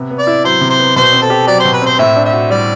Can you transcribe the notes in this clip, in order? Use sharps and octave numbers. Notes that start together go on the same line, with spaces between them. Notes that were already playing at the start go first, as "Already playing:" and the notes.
Already playing: C3 B3
B3
D5
E4
F#3 C5
C3
C5
B3
B2 C5
C4
A4
G4
F#3 D5
C5
B2
B4
C4 C5
A2 E5
D4
E5
F#4
G3 D5